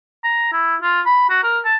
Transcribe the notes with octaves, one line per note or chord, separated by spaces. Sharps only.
A#5
E4
F4
B5
F#4
A#4
A5